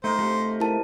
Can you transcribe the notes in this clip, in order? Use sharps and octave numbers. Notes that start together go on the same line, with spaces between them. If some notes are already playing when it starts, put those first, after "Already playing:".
A3 D#4 A#4 C5
C3 F3 A3
E4 A#4 A5